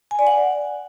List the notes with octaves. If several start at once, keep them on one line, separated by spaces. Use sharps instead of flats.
G#5
D5
F#5